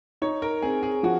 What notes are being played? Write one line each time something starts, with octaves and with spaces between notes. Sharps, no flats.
D#4 C#5
A#4
C4 G#4
G#4
F3 F#4